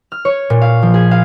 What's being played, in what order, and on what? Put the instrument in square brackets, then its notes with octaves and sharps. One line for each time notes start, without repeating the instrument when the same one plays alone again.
[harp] F6
C#5
A#2
F5
F3
G#4
F5